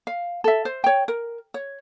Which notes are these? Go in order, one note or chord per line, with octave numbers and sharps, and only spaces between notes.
F5
A4 E5
C5
C#5 G5
A#4
C#5